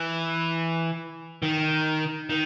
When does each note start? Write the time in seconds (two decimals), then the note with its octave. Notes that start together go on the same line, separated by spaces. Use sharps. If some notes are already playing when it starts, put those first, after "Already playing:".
Already playing: E3
1.42 D#3
2.30 D#3